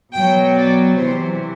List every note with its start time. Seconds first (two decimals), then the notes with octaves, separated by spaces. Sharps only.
0.13 B2 F#3 G5
0.56 D5
0.96 C3 E3 C5